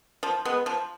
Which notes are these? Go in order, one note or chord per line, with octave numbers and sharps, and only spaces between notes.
F3
G#3 B3
F3